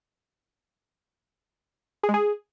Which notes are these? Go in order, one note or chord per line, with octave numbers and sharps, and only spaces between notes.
G#4
G#3
G#4